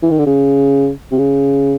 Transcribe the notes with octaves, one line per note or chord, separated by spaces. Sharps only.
E3
D#3
D3
C#3
C3
C#3